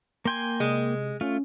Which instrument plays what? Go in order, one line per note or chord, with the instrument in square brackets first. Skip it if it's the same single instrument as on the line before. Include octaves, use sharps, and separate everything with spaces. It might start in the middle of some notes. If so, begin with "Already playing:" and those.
[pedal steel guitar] A#3 G5 G#5 [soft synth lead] C6
[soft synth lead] C3 [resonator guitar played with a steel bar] G#3
[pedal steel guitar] A3 F4 [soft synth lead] C#4